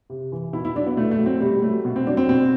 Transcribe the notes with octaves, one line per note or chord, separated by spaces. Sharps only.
C3
E3
B2 E4
E4
F#3 D4
B3
B2 A3
A3
F#3
C4
B2 G3
F#3 A3
B2
C4
F#3 D4
C4
B2 C4